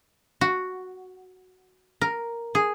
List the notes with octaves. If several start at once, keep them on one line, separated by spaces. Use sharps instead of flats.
F#4
A#4
G#4